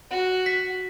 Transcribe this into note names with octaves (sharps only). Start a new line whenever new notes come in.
F#4
B6